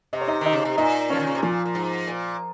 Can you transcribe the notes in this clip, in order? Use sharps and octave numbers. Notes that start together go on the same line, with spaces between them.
C3 D#5
C#5
D#4 D#5
D#3 D#4 D#5
C#3
C3
A#2 D#4 D#5
F3 C#4 C#5
D#3
C#3
C3
A#2 F3 F4
A#2
G#2
A#2